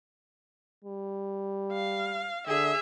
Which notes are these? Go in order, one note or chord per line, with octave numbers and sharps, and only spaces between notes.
G3
F5
D3 G#4 E5